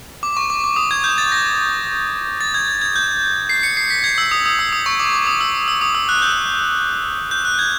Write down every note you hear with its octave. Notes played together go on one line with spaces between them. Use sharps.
D6
C#6
D6
D6
D#6
G#6
G6
A6
A#6
A6
G#6
G#6
G#6
G6
C7
C#7
C7
B6
G#6
E6
D#6
D#6
E6
D#6
C#6
D6
D6
D#6
E6
E6
D#6
E6
F#6
G6
G6
F#6
G#6